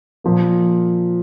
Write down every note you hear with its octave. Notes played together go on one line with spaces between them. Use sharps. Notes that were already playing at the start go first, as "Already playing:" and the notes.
A#2 F3 A#3